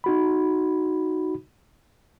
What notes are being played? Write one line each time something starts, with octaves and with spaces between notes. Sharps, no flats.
D#4 F#4 B5